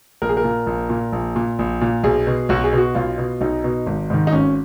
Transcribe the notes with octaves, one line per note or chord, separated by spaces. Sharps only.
A#1 A#4
G#4
A#4
A#2
A#1
A#2
A#1
A#2
A#1
A#2
B1 G#4
B2
B1 F#4
G#4
B2
F#4
B1 F4
B2
B1 D#4
B2
G#1
G#2 D#3
D#4
G#1 C#4